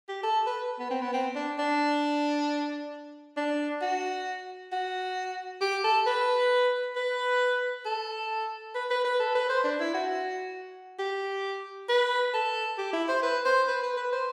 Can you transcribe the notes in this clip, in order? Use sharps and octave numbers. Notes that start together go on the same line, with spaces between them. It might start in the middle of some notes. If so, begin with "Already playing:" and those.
G4
A4
B4
B3
C4
B3
C4
D4
D4
D4
F#4
F#4
G4
A4
B4
B4
A4
B4
B4
B4
A4
B4
C5
D4
E4
F#4
G4
B4
A4
G4
E4
C5
B4
C5
B4
B4
B4
C5